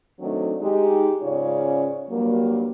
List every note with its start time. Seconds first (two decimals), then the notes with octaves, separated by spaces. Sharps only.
0.20 D#3 F#3 A3 C4 D4 D#4
0.61 G#3 D#4 G4
1.22 G#2 C#3 C#4 F4 C#5 D5
2.10 G2 F#3 G3 A#3